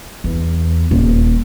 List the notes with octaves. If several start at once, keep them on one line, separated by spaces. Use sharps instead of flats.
E2
D#1